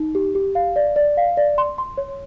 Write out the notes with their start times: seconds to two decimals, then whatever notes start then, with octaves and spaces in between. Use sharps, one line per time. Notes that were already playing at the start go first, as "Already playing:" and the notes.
Already playing: D#4
0.15 G4
0.35 G4
0.55 F5
0.76 D5
0.96 D5
1.17 F5
1.37 D5
1.58 C6
1.78 C6
1.97 C#5